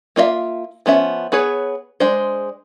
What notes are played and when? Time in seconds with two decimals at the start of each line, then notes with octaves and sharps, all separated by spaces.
0.16 A#3 F4 D5 E5 F5
0.86 F3 B3 C#4 E5
1.32 B3 G#4 B4 C#5
2.00 G#3 D4 C5